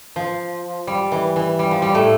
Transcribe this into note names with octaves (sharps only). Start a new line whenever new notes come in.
F3
G3
E3
E3
G3
F3
G3
A2 A3